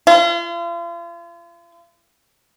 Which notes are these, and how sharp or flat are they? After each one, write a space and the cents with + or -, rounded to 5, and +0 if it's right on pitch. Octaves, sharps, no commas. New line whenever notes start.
F4 -40